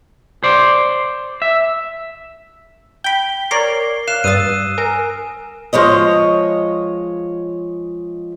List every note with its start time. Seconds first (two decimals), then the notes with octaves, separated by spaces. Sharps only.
0.43 C5 D5
1.42 E5
3.04 G5 B5 G7
3.51 A#4 C#5 D5 C7
4.08 F5 F#6 C7 E7
4.24 G2 D#6 E6 A6 D#7
4.78 A#4 G#5
5.73 F3 G#3 C#5 D#5